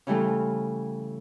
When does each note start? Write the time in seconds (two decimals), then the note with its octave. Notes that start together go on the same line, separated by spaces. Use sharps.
0.07 C#3 E3 G3 A3 F4